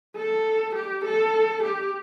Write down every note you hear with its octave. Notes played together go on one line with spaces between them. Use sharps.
A4
G4
A4
G4